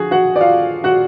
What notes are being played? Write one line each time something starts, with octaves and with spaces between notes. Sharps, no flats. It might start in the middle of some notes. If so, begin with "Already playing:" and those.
Already playing: D3 F3 F#4 G#4
F#4 F#5
D5
F4 F5
F#4 F#5